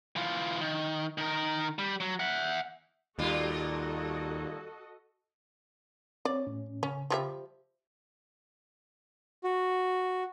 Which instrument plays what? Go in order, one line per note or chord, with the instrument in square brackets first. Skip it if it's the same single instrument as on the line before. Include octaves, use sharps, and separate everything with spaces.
[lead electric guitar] E3 F4
D#3
D#3 A#4
G3
F#3
E5 F#5
[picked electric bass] D#2 [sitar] A#2 G3 F4 [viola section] F#4 A4 D#5
[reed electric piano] C4 C#5 [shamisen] D5
[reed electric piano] A2 C#4
[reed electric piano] C#3 [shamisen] C#4
[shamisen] F3 G3 E5
[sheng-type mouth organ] F#4